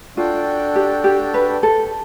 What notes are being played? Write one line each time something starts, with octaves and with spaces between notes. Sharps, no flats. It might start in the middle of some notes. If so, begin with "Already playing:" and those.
D4 F4 F#4 A4 D5 G5
G4
G4
B4
A4